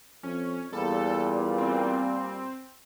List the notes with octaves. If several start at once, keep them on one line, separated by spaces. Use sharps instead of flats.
F2 C#4
E2 A#2 G3 A4
C4